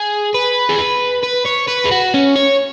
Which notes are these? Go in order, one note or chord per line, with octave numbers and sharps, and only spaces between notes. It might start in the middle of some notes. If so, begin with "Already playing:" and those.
Already playing: G#4
B4
G#4
B4
B4
C#5
B4
G#4
F#4
C#4
C#5